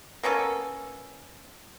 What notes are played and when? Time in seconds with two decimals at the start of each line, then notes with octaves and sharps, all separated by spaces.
0.23 A#3 B3 C#4 A4